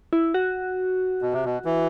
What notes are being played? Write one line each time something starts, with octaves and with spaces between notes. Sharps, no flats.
E4
F#4
B2
C3
B2
E3